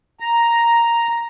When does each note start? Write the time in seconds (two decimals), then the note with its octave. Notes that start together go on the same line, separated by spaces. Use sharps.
0.20 A#5